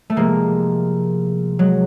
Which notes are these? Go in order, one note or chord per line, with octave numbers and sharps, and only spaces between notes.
A3
C3 F3 G#3 A#3
F#3 G#3